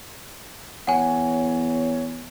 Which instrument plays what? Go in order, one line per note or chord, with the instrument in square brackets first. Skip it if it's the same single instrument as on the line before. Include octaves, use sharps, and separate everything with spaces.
[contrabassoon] E2 [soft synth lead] C#5 [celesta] F#5 G#5